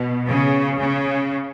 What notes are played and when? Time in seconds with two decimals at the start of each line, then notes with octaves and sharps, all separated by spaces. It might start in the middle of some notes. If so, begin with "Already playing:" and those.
Already playing: B2
0.27 C#3
0.79 C#3